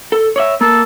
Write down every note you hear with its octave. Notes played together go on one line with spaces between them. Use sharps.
A4
C#5 D5 E5
A#3 A4